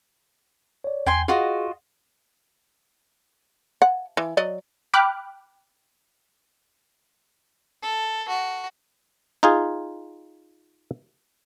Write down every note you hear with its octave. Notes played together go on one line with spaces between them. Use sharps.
C#5 D5
E2 G5 G#5 C6
F4 F#4 G#4 D#5
F#5
E3
F#3 D5 D#5
G5 B5 D6 F6 F#6
A4
F#4
D#4 F4 G#4